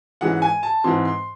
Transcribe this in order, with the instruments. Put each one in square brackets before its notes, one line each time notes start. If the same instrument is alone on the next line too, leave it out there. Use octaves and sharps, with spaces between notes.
[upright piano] G#2 E3 G#3 C#4 F#5
G#5
A5
G#2 E3 C4 C6
C6